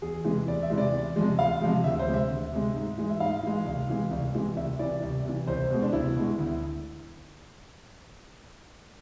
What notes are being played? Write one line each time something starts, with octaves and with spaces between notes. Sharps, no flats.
E2 G#4
C3 E3 G#3
E2 D5
E5
C3 E3 G#3
D5
E2
C3 F3 G#3
E2 F5
C3 F3 G#3
D2 E5
C5
C3 G#3
E5
D2
C3 G#3
G#2
E3 G#3
E5
G#2 F5
E3 G#3
C2
C3 E3 G#3
C2
C3 E3 G#3
C2 E5
C3 E3 D5
C2
C3 E3
C2 C5
B2 G#3
D4
C2 E4
B2 G#3
D2